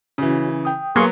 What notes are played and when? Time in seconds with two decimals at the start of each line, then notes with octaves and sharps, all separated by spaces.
0.18 C#3 E3 C#4 F#4
0.65 G5 D#6
0.96 F#3 A#3 B3 G#4 C6 C#6